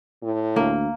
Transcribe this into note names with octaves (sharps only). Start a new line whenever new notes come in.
A2
D2 A#3